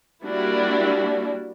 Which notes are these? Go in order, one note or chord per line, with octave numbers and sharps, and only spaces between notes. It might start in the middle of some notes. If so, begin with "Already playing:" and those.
G3 A#3 D4 E4 F#4